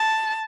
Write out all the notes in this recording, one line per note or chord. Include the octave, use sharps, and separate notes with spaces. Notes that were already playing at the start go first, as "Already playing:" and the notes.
Already playing: A5